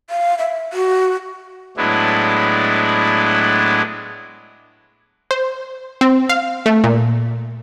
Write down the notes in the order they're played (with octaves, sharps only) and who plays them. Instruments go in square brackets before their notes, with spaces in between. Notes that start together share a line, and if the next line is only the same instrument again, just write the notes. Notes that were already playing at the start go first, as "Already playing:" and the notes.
[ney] F5
E5
F#4
[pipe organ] A2 F#3 G#3 B3 D4 E4
[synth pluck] C5
C4
F5
A3
A#2